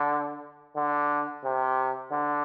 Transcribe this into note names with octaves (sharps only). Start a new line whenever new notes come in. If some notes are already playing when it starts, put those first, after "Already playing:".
Already playing: D3
D3
C3
D3